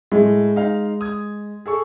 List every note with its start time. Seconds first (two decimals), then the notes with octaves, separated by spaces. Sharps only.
0.12 A2 G#3
0.56 D#4 F5
1.01 D#6 G#6
1.66 G#4 A4 C#6